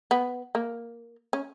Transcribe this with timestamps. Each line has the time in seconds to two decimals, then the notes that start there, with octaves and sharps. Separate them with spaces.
0.11 B3
0.55 A#3
1.33 C#4